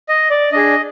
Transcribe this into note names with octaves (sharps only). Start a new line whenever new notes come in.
D#5
D5
D4 G#4 D#5